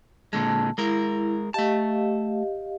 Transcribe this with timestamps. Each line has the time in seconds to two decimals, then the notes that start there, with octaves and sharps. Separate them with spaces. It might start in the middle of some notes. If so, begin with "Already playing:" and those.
0.33 A#2 D3 G#3 A5
0.78 G#3 E4 A#4
1.54 A3 G4 D#5 F5 A5